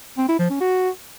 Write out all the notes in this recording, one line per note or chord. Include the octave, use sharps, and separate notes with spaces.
C4
E4
F3
C#4
F#4